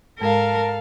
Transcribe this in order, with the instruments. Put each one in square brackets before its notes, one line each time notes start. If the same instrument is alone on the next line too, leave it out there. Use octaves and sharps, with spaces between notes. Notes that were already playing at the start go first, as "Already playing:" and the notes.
[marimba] G#2 G#3 [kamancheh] A4 F5 [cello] A#4 [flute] A5